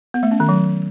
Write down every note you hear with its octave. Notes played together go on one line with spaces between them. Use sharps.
B3
A3
C#4
D#3
F#3